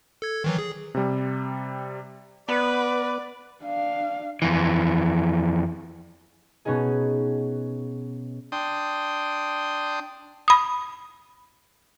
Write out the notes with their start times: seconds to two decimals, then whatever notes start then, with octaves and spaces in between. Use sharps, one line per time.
0.22 A4 G#6
0.44 D#3 E3 F#3
0.59 G#4
0.95 C3 G3
2.49 B3 B4 D5
3.64 D4 F5
4.42 F2 E3
6.65 B2 B3 C#4 D#4 G#4
8.52 D4 G5 C6 D#6
10.48 B5 D#6